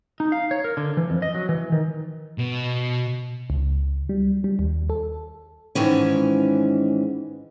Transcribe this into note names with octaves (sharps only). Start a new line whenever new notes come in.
D#4
F5
C#5
A#4
D3
E3
F2
D#5
F#3
E3
D#3
B2
C#2
G3
G3
D#2
A4
G#2 D#3 E3 C#4